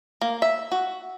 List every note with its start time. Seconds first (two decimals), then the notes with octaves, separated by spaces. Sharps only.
0.21 A#3
0.42 E5
0.72 F#4